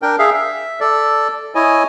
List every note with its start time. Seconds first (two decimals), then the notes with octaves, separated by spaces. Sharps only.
0.02 D4 A#4 G5
0.19 G#4 E5 F5
0.34 E5
0.80 A4 D5
1.55 E4 C#5 D#5 G#5